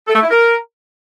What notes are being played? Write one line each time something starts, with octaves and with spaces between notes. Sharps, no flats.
A4
A3
E4
A#4